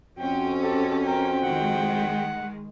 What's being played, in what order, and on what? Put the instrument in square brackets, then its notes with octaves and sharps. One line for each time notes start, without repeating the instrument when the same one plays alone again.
[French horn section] F2 C4 F#4 [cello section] C#4 [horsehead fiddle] G5
[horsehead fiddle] G4 A4
[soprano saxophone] A#4 [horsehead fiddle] G5
[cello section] D#3 G#3 [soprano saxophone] F#5